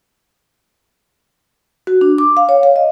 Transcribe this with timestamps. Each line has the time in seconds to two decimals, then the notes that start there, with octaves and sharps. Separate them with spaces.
1.87 F#4
2.01 D4
2.18 D6
2.37 F5
2.49 C#5
2.63 F5
2.76 D#5